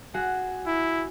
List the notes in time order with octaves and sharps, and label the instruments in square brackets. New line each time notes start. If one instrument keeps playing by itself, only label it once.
[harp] F#4 G#4
[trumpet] E4